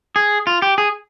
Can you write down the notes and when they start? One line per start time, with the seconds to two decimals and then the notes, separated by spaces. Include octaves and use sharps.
0.16 G#4
0.47 F4
0.62 G4
0.78 G#4